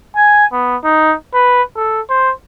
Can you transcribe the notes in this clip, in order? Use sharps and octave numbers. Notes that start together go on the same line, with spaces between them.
G#5
B3
D#4
B4
A4
C5